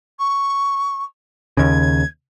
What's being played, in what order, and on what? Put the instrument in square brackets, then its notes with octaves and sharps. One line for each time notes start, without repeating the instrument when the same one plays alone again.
[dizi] C#6
[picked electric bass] D#2 C#3 [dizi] G#6